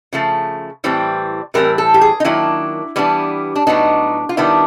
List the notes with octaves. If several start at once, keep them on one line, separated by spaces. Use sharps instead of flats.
C#3 F3 A3
A2 E3 G3 C4
A2 E3 G3 C4 A#4
A4
G4
G#4
D#4
D#3 F#3 A#3 D4 E4
E3 G3 B3 D4
D4
A2 F#3 B3 D4 D#4
F4
D#3 G3 B3 D4 E4